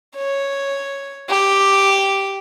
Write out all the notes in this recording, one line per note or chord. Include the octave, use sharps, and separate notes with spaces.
C#5
G4